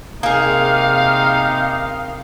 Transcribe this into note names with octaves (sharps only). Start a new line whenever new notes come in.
C3 A#3 D#4 G#4 F5